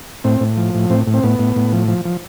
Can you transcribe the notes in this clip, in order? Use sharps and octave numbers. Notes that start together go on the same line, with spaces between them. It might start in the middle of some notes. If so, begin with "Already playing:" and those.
A2 C4
A2
F3
A2
A2 C4
A2
C4
A2 B3
A2
A2
F3
F3
F3